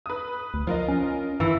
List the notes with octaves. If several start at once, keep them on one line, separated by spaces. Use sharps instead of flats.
B4 D#6
D2
F3 F4 A#4 D#5
C#4
G2 E3